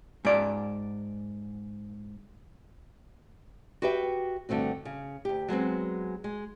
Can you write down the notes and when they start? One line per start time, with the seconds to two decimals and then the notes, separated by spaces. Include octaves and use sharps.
0.25 G#2 D5
3.82 F#4 G4 B4 E5 G5
4.49 G2 D3 A3 C4 F#4
4.85 C#3
5.25 D2 G4
5.48 F#3 G#3 B3 C4
6.24 G#3